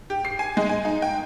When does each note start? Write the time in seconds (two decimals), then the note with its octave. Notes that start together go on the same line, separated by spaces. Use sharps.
0.10 G4
0.25 C7
0.39 G#5
0.57 G#3
0.69 G#5
0.85 D#4
1.02 G5